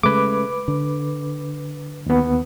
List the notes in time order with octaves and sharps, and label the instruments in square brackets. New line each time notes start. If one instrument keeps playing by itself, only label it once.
[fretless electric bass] C#3 G#3 A3 [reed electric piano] B4 D6
[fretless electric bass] D3
[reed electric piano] D#2 B3